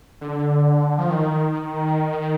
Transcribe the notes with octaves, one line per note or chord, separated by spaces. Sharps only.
D3
F3
D#3